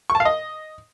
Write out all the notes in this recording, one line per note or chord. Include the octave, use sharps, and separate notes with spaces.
C#6
A5
F5
D#5